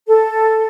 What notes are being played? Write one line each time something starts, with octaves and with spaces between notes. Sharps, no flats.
A4